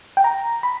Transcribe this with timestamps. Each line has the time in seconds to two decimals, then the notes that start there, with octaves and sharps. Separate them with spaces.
0.17 G5
0.24 A#5
0.63 B5